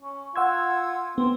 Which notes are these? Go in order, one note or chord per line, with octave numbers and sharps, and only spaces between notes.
C#4
F4 F#5 E6 G#6
B3 C4